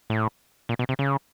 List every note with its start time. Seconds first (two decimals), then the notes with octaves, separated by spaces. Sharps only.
0.10 A2
0.69 A#2
0.79 B2
0.89 C3
0.99 C#3